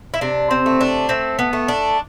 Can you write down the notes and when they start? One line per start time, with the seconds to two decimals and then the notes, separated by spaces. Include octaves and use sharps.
0.14 E4
0.21 C3 D4
0.51 C4
0.66 A3
0.81 D4
1.09 A3 C4
1.39 B3
1.53 A3
1.68 D4